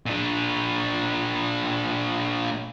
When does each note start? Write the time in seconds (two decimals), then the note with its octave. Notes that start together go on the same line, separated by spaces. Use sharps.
0.06 A#2 D4